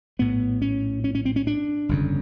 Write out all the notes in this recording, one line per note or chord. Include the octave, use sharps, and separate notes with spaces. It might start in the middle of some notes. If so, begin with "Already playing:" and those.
A#1 A2 B3
C#4
C#4
C#4
C4
C#4
D4
G1 F2 C#3